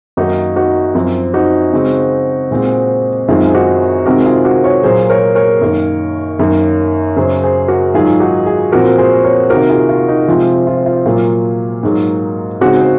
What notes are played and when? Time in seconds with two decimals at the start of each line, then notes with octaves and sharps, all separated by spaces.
0.17 F#2 D#3 A#3 D#4 F#4
0.56 D#4 F#4
0.95 F#2 F3 C4
1.34 D#4 F#4
1.73 C#3 G#3 C4
2.51 A#2 G#3 C4
3.28 F#2 D#3 G#3 C4 F4
3.50 G#4
3.54 D#4 F#4
4.06 C3 D#3 G#3 C4 F#4 A#4
4.25 F4 G#4
4.44 F#4 A#4
4.64 A#4 C#5
4.83 A#2 F#3 A#3 G#4 C5
5.10 A#4 C#5
5.35 A#4 C#5
5.61 F#2 D#3 A#3
6.39 F#2 D#3 A#3
7.16 F#2 C#3 F#3 G#4 C5
7.43 G#4 C5
7.68 F#4 A#4
7.94 G#2 D#3 F#3 F4 G#4
8.20 D#4 F#4
8.46 F4 G#4
8.72 A#2 F3 C4 F#4 A#4
8.98 G#4 C5
9.24 A#4 C#5
9.50 C3 D#3 A#3 F#4 A#4
9.70 F4 G#4
9.89 F4
10.08 D#4
10.28 C3 F3 G#3 C4 F4
10.67 F4
10.86 F4
11.06 A#2 F#3 A#3 F4
11.83 G#2 F#3 A#3
12.61 C#3 G#3 C4 D#4 F#4
12.80 C5